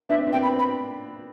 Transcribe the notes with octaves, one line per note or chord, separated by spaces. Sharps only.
B3 D4 E5
C4
B3 D4
C4 G5
B3 B5
C4
B5